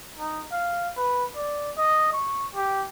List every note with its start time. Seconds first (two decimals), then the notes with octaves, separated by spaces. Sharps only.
0.19 D#4
0.52 F5
0.97 B4
1.36 D5
1.77 D#5
2.13 C#6
2.55 G4